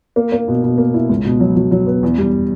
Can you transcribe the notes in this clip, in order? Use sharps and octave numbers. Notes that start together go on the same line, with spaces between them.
A#3
A#3
B2
B2
A#3
E4
C#2
B2
F#3
F#3
F#3
B3
E2
G3